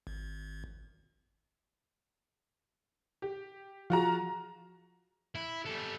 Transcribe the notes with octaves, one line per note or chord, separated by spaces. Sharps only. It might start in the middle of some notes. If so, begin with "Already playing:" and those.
G#1
G4
F3 F4 F#4 G#4 A#5
E4
G3 A4